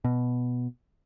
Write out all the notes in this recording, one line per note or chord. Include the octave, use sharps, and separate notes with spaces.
B2